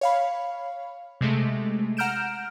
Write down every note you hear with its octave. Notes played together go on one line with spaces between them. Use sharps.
C#5 F5 B5
C3 G#3 A3
F#5 A#5 F6 G6 D7 E7